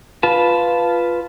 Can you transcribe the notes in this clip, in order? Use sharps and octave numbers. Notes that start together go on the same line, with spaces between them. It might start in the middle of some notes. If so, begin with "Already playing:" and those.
F4 B4 A5